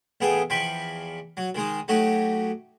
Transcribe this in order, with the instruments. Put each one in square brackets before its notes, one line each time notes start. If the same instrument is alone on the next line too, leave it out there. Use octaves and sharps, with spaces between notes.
[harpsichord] A1 B3 G#4 A4 G5
E2 F3 G5 B5 C#6
F#3
D#3 G#3 D#4
F#3 A3 D#4 F#4 G4